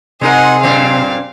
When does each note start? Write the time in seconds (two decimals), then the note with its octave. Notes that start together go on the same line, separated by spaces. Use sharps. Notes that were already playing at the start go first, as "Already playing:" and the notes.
0.21 C3 G#3 D#4 G#4 A#4 F#5
0.63 F#2 A#2 C4 F5